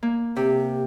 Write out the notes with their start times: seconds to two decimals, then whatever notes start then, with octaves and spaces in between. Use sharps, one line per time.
0.03 A#3
0.36 C3 G4